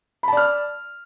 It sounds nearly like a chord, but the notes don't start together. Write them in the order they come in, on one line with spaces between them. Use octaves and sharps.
B5 A5 D5 F6